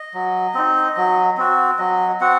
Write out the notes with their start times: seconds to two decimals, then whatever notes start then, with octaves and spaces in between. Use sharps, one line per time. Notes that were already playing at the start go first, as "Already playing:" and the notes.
Already playing: D#5
0.14 F#3
0.54 C4 D#4
0.97 F#3
1.38 C4 F#4
1.79 F#3 D#5
2.20 C4 F#4 F#5